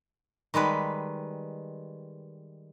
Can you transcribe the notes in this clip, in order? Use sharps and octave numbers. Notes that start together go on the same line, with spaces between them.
D#3 G3 G#3 B4